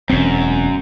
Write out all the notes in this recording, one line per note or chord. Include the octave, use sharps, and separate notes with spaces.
E1 F#2 C4